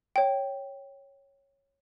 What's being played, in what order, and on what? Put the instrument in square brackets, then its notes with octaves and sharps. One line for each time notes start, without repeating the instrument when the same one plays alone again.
[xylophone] C#5 G5